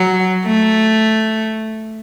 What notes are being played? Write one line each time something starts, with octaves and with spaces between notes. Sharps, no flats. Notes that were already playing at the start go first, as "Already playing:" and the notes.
Already playing: F#3
A3